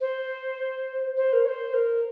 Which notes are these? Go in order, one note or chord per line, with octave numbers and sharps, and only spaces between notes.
C5
C5
A#4
C#5
C5
A#4